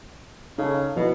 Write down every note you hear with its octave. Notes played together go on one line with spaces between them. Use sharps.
C#3 D#4 A4
B2 F3 E4